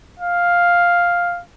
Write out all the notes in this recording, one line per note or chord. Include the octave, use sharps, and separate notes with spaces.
F5